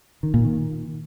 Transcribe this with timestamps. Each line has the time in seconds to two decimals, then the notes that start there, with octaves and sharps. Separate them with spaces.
0.23 D#3
0.34 A#2
0.45 D#3